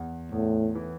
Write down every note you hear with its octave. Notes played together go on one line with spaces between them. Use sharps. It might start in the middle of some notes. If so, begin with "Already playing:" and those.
Already playing: E2
E2 A2
E3